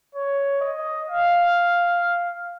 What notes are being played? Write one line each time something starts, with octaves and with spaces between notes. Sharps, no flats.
C#5
D#5
F5